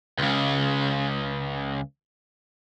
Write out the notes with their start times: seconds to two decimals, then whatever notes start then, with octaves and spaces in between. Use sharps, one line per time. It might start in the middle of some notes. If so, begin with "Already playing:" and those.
0.19 C#2 C#3